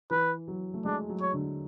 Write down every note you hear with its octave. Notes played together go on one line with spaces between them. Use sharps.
E3 B4
F#3
A3
G#3 D4
F#3
C#5
D3